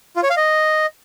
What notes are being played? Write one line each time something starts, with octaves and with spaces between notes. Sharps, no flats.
F4
C#5
F5
D#5